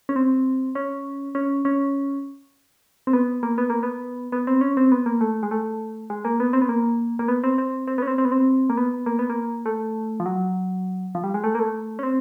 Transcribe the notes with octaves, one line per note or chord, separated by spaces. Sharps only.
C#4
C4
C#4
C#4
C#4
C4
B3
A#3
B3
A#3
B3
B3
C4
C#4
C4
B3
A#3
A3
G#3
A3
G#3
A#3
B3
C4
B3
A#3
A#3
B3
C4
C4
C4
B3
C#4
C4
C4
B3
C4
A#3
B3
A#3
B3
A#3
A3
F3
F#3
F3
G3
G#3
A3
A#3
A3
C#4
C4